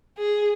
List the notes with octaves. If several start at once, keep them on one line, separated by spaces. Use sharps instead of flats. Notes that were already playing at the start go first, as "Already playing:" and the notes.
G#4